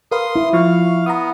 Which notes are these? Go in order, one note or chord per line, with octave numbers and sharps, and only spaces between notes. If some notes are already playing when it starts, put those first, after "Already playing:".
A#4 B4 F5 C6 D#6
E4
F3 F5 C#6
B3 A#5 D#6